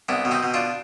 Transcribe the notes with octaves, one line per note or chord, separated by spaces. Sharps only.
C2 B3 D4
B2
C4 D#4
B2
D4 F4